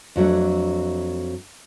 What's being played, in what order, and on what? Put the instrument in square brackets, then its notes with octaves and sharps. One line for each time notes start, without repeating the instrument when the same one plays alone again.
[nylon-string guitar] F2 F#3 A3 D4